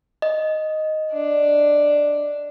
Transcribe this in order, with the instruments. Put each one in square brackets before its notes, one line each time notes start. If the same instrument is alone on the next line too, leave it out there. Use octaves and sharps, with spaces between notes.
[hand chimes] D#5
[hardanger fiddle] D4